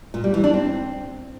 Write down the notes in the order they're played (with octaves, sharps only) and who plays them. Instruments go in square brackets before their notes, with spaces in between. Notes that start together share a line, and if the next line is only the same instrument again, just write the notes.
[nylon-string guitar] A#2
G3
E3
D4
C4